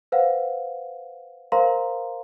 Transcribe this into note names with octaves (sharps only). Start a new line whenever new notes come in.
B4 C5 F5 F#5
A#4 C5 F5 A#5 C6